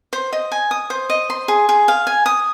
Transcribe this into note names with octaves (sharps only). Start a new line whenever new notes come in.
C5
D#5
G#5
D#6
C5
D#5
C6
G#4
G#4
F5
G#5
D#6